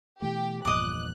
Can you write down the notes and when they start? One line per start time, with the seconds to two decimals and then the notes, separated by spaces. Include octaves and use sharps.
0.22 B2 E3 A3 G4
0.65 G1 E2 A#2 F3 D#5 D6 F#6